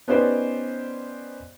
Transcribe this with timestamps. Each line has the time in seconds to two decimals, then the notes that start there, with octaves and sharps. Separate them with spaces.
0.08 B3 C#4 D#4 G4 C5 D5